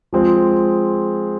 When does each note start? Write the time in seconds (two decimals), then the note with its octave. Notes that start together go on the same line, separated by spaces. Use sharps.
0.12 F3 G#3 C4 F4 G#4